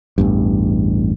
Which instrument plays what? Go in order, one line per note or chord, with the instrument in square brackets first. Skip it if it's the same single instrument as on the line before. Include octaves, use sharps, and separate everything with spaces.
[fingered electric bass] A1 E2 G2